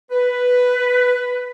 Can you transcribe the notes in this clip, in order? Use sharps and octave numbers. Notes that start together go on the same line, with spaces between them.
B4